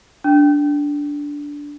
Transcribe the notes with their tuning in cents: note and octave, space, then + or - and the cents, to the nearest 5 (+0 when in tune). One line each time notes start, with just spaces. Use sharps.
D4 -15